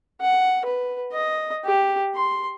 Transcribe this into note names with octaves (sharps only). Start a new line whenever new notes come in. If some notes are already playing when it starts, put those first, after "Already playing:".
F#5
B4
D#5
G4
C6